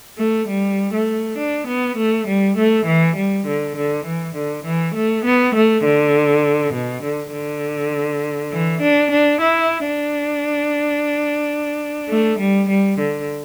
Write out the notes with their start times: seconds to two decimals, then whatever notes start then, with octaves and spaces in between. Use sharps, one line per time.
0.18 A3
0.49 G3
0.94 A3
1.38 D4
1.67 B3
1.97 A3
2.28 G3
2.57 A3
2.86 E3
3.16 G3
3.47 D3
3.77 D3
4.06 E3
4.36 D3
4.65 E3
4.95 A3
5.25 B3
5.55 A3
5.85 D3
6.74 B2
7.03 D3
7.33 D3
8.52 E3
8.82 D4
9.12 D4
9.41 E4
9.86 D4
12.09 A3
12.39 G3
12.69 G3
12.99 D3